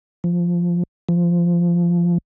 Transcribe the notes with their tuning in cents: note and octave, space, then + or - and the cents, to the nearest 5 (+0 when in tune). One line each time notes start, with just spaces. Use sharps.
F3 -5
F3 -15